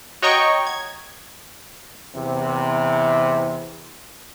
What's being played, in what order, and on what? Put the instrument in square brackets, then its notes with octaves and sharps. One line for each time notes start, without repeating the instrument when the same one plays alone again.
[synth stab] F#4 C#5 D#5 G5 A#5 C#6
G#6
[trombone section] E2 C3